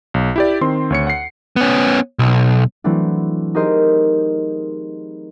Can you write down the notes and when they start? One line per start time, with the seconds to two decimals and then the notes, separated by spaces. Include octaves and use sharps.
0.14 B1
0.36 E4 G4 D5
0.61 D#3 C4 C6
0.90 D2 C#5 C#7
1.07 F#5 C7
1.56 B3 C#4
2.19 B1
2.84 E3 F#3 A3 C4 D4
3.55 D#4 G4 G#4 A#4 C5 D#5